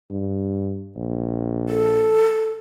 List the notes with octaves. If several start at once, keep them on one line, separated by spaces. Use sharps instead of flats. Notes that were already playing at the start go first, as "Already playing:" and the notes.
G2
A#1
A4